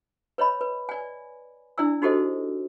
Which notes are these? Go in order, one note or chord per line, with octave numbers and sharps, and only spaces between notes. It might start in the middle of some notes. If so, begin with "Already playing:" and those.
B4 C#5 D#5 B5
B4
D5 G#5
D4 E4 D5 G#5 E6
D#4 F#4 G4 A4 C5 D#5